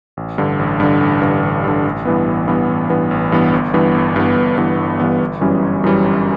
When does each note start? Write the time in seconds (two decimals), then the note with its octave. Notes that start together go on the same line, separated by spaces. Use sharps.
0.17 A1
0.38 G2 D3
0.59 A1
0.80 G2 D3
1.01 A1
1.22 G2 D3
1.43 A1
1.64 G2 D3
1.85 A1
2.05 G2 E3 B3
2.27 A1
2.48 G2 E3 B3
2.68 A1
2.90 G2 E3 B3
3.11 A1
3.32 G2 E3 B3
3.52 G1
3.74 G2 E3 B3
3.95 G1
4.16 G2 E3 B3
4.36 G1
4.58 G2 E3 B3
4.78 G1
5.00 G2 E3 B3
5.21 G1
5.41 F#2 E3 G3 C#4
5.62 G1
5.84 F#2 E3 G3 C#4
6.04 G1